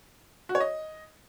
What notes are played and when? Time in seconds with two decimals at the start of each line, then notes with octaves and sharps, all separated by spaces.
0.49 F#4
0.55 C#5
0.60 D#5